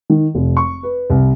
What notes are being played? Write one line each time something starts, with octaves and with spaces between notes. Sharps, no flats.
D#3
F1
C#6
B4
C2